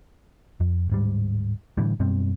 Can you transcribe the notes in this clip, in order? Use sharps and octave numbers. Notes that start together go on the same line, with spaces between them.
F2
D1 G#2 G3
A2 D3 E3 G3
F#2 B2 G3 C4